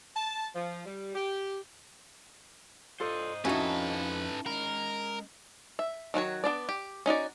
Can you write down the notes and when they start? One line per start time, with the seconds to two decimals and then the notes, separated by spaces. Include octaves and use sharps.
0.16 A5
0.55 F3
0.86 G3
1.15 G4
3.00 F4 A4 C5 D5 D#5
3.45 F2 C#4 D#4 E4 F#4 A4 B4 E5
4.46 G#3 A#4 B5
5.79 E5
6.14 D#3 F#3 F#4 C#5
6.44 B3 D4 D5
6.69 G4
7.06 C#4 D#4 F#4 D5